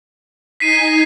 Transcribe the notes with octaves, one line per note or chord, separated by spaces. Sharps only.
D#4 G#5 B6 C7 D#7